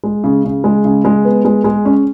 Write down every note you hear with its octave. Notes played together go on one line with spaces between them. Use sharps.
G#3
C#3
C#3
G#3
C#3
G#3
B3
G#3
G#3
C#4